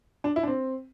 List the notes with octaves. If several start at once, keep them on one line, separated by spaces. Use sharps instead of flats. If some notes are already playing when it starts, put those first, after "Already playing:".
D4
E4
D4
C4